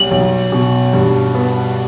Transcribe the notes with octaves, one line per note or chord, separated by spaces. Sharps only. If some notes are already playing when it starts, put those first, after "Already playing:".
Already playing: B1 G3 F#7
B1
B2
G2
B3